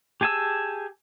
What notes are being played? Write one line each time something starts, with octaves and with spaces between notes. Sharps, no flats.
G4 G#4 G#5 A5 E6